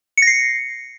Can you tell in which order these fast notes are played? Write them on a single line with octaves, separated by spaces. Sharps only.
C#7 A#6 C7